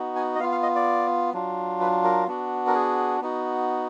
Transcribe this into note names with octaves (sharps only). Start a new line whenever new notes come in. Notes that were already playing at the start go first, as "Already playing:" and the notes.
Already playing: B3 D#4 F#4
G#5
D#5
B3 F4 F5
F5
D#5
D5
F#3 D4 F4
B4
A#4
B3 D4 F#4
A#4
G#4
B3 D#4 F#4